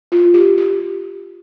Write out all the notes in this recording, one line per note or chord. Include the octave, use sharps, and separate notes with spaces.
F4
G4
G4